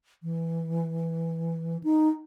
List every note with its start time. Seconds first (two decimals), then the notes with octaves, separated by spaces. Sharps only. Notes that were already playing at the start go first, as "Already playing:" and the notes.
0.23 E3
1.84 D#4